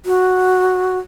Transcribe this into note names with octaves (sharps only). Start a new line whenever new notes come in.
F#4